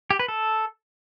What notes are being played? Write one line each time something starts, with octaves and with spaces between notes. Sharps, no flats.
G4
B4
A4